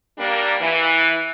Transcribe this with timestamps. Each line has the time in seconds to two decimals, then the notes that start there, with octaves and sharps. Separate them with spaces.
0.18 G3 A#3 D4
0.61 E3